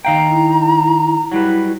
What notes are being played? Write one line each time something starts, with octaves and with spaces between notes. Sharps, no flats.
D#3 F5 G5 A#5
E4
F#3 G3 E4 B4